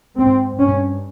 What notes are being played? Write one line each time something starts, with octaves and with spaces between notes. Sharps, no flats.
G#2 C4
G2 C#4